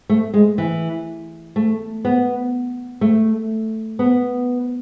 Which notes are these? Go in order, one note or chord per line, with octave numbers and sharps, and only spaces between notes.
A3
G#3
E3
A3
B3
A3
B3